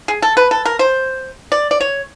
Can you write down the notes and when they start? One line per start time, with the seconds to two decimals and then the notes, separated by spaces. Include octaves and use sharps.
0.08 G#4
0.22 A4
0.37 B4
0.51 A4
0.66 A#4
0.79 C5
1.52 D5
1.71 D5
1.81 C#5